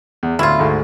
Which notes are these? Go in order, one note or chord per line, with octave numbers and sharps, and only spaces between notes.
E2
D2 A2 E4 F4
D2 G#2 D3